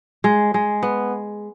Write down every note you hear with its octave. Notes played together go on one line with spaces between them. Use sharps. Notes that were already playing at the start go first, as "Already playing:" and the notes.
G#3
G#3
B3